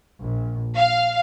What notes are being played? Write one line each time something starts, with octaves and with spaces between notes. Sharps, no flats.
A#1
F5